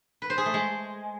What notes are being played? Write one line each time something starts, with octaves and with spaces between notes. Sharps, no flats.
B4
C5
G#4
A3
G#3